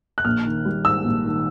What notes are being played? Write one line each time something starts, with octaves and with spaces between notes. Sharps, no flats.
F#6
A#1 F6
D#3
G3
G#2 E6
A#1
D#3